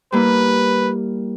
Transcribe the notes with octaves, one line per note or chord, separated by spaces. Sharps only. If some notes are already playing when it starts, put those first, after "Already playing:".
G3 A#3 E4 B4